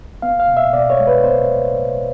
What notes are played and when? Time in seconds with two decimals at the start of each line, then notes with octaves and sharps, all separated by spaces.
0.22 B3 F5
0.40 F5
0.48 B2
0.57 E5
0.73 B2 D5
0.90 C#5
1.00 G#3
1.07 B4
1.24 B3 C5